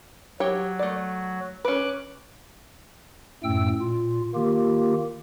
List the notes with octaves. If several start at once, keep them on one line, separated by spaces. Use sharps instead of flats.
F#3 G4 C#5 G5
A3 D5
C#4 B4 D6 F#6
F#2 A2 A3 G5 E6
A#2 F4
D#3 A#3 F4 G4